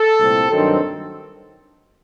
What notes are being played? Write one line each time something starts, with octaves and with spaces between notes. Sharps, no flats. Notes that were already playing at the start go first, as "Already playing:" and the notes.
Already playing: A4
C2 A#2 A3 C4
G2 D#3 F#3 C4